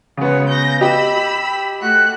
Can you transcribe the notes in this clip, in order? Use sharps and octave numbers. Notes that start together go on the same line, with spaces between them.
C#3 G#3 B3 F#4 C#5
G6 A#6
G4 D#5 B5 E6
A3 F#4 F#6